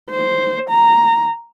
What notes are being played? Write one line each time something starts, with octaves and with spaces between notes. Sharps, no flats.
C5
A#5